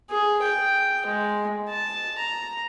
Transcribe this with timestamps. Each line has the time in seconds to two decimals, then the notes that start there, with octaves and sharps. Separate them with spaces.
0.10 G#4
0.43 G5
1.06 G#3
1.69 A5
2.18 A#5